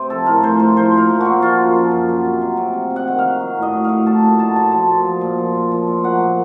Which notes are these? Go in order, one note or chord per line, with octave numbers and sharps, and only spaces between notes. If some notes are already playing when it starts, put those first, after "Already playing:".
Already playing: C3 C5
F3 A4
A2 A#4
F3 C5
A2 C5
F3 C5
A#2 A#4
F3
A#2 F#4
F3 F4
F#2
F3
F#2
F#3
C3
F#3
C3
C3
C3
F#5
D#3
F5
F#3
F#3
A2
D#5
F#3
A2 F5
F#3 A5
A#2
F#3 A5
A#2 A5
F3 A5
A#2
F3
A#2
F3
A#2
F3
A#2
F#3 F#5
A#2